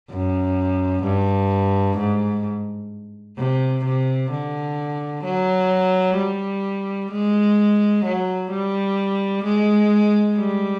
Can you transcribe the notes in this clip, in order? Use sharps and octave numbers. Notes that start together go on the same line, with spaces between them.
F#2
G2
G#2
C3
C3
D3
F#3
G3
G#3
F#3
G3
G#3
G3